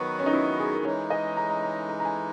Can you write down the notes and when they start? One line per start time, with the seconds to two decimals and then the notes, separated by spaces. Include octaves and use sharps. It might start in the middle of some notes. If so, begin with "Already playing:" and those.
Already playing: D#3 F#3 B3 F#4 B4
0.19 C#4
0.26 D#4
0.33 E4
0.59 G#4
0.72 A#4
0.85 E3 G#3 D#4 C#5
1.10 D#5
1.37 A#5
1.50 A#5
1.63 A#5
1.89 A#5
2.00 A#5
2.05 G#5